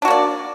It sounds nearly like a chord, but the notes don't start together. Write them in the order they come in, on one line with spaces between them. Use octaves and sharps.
D4 F#4 A#3 D5